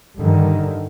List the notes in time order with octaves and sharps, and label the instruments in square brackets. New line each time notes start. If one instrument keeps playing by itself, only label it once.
[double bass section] G2 D3 D#3